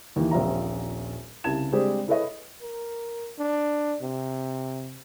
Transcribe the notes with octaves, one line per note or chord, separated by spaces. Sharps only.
D#2 E3
D#1 A#1 C4 F4 E5 A#5
C2 C#3 A5 G#6 E7
G3 G#3 C4 D4 G4 G#4
E4 G#4 A4 B4 C#5 D#5
A#4
D4
C3